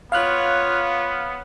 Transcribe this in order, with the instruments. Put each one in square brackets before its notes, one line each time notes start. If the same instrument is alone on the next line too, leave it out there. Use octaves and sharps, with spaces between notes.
[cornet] B3 [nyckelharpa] F4 C#5 [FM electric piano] F5 F6 F#6